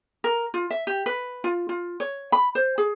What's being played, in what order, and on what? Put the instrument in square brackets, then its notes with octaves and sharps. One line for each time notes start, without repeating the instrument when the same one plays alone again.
[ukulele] A#4
F4
E5
G4
B4
F4
F4
C#5
B5
C5
G#4